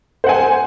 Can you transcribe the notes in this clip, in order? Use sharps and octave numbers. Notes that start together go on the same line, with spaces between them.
C5 F#5 G#5